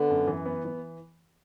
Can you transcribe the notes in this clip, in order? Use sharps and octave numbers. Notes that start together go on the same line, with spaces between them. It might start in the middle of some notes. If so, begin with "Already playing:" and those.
Already playing: D3 B3
F#2
E3
B3
E3